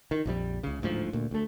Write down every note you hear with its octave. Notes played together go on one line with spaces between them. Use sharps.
D#3
A#1 F2 G3
C#2 C#3
D1 D2 G#2 F3
D2 A#2
D2 A3